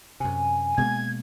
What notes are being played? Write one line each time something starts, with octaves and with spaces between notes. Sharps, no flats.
F#2 C3 G#5
B2 G#3 A#3 G#6